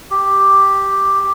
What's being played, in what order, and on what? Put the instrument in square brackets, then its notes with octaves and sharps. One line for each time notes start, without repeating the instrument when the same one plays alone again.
[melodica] G4